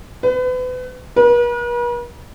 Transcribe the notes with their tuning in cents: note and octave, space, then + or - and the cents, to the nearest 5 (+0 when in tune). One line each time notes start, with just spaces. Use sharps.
B4 +35
B4 -45